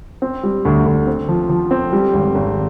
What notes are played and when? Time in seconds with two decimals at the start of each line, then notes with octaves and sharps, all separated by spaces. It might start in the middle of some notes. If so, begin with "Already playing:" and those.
0.22 C4
0.43 G3
0.65 D2
0.86 D2
1.07 C4
1.28 F3
1.49 F3
1.71 C4
1.93 G3
2.14 G#1
2.35 G#1